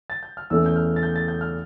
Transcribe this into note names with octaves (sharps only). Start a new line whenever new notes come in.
A6
G6
F6
E2 E3 A3 C#4 E6
G6
F6
A6
G6
A6
G6
F6